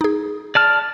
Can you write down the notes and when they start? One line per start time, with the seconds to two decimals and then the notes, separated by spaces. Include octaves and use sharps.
0.01 D#4 G#4
0.55 D5 A5 F6